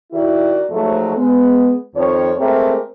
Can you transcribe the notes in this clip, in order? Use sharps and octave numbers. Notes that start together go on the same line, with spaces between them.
D#3 E4 F#4 G4 A#4 D5
G#2 F3 F#3 A3
G#3 B3
F2 D#3 F3 C#5
G#3 A3 C4 G4 A#4